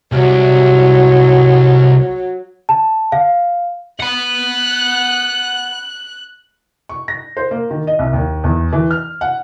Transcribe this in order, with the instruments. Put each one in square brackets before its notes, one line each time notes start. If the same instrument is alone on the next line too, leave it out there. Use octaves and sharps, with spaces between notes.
[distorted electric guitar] C2 [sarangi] F#3
[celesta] A5
F5
[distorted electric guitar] F#5 B5 [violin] F#6
[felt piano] C#6
A#6
C5
A#3
D#3
D#5
C2
D#2
E2
E3
F6
F#5